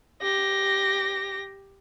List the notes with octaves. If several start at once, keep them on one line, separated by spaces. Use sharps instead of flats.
G4 A#6